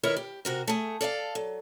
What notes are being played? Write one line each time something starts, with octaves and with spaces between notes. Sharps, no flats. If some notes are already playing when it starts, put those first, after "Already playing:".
D#3 E4 A#4 B4 C#5 E5
G4
C3 F#4 A#4
A3 G#4
A4 D5 D#5 F5
F#3